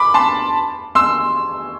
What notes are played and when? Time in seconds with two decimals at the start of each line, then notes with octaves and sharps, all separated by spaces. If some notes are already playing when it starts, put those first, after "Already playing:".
Already playing: B5 D6
0.14 A5 C6
0.95 C6 E6